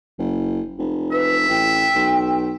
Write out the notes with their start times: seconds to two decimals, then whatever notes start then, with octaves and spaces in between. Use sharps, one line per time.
0.19 F#1
0.79 F1
1.12 B4 E5
1.49 A1 G5
1.95 B1